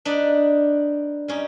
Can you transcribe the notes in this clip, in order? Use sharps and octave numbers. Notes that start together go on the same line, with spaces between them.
D4 D#4 B4 D5
G3 C#4 D#4